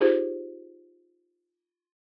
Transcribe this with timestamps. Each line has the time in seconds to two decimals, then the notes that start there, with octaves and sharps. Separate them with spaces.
0.01 D#4 F4 G4 G#4 C5